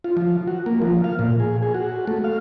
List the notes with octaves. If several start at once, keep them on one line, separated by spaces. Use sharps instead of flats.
F4
F3
F#4
A#3
F3
F5
A#2
G#4
G#4
F#4
A3
F5